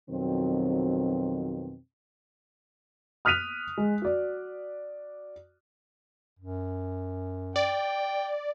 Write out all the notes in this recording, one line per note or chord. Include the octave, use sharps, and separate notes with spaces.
F2 B2 D#3 F#3 C4
D#6 F6 F#6 B6 D#7 F7
G#3
F#4 D5
F#2
D5 G5